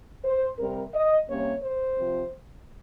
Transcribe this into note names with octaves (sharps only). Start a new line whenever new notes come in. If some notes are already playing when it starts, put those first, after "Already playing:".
C5
C3 G3 C4 A#4
D#5
C3 G3 A#3 C#4 C#5
C5
C3 F3 C4